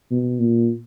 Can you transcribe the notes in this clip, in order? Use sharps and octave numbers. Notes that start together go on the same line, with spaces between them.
B2
A#2